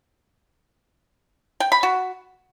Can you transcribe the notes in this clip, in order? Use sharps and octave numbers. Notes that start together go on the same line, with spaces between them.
G5
B5
F#4